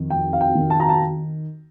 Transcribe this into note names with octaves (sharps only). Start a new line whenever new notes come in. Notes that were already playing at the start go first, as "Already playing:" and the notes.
Already playing: F2 D#3
F2 G5
F5
G5
D#3
A5
A#5
A5